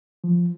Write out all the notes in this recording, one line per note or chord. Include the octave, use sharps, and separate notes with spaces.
F3